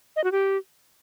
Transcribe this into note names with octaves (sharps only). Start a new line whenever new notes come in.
D#5
F#4
G4